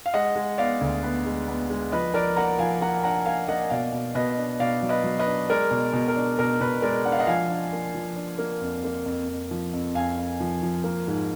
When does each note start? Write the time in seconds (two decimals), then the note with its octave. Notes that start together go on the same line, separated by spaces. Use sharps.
0.06 F5
0.14 G#3 D#5 F#5
0.35 G#3
0.58 B3 D5 F5
0.81 D2
1.03 B3
1.26 G#3
1.48 B3
1.70 G#3
1.92 F3 B4 D#5
2.14 F3 A#4 D5
2.36 A#3 F#5 A#5
2.59 F3 F5 G#5
2.81 A#3 F#5 A#5
3.03 D4 F#5 A#5
3.26 A#3 F5 G#5
3.48 A#3 D#5 F#5
3.70 B2 D5 F5
3.92 B2
4.15 B2 B4 D#5
4.38 D4
4.60 B2 D5 F5
4.83 F#3
4.89 B4 D#5
5.04 F#3
5.19 B4 D#5
5.26 D4
5.50 G#3 A#4 D5
5.71 B2
5.93 B2
6.08 A#4
6.16 D4
6.39 B2 A#4
6.61 B2 B4
6.82 G#3 A#4 D5
7.05 D4 F#5
7.12 F5
7.19 D#5 F#5
7.27 F3 F5 G#5
7.49 D4
7.73 A#3
7.94 F3
8.16 D4
8.38 A#3
8.61 F2
8.84 A#3
9.06 F2
9.28 F2
9.51 F3
9.73 F2
9.95 F2 F5 G#5
10.17 F2
10.40 F3
10.63 F3
10.84 A#3
11.07 G#2